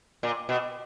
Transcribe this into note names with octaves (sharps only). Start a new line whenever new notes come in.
A#2
B2